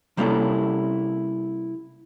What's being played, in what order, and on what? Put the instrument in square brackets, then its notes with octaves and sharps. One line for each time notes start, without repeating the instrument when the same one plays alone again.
[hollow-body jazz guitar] C3 G3 A#3 C#4 E4 A4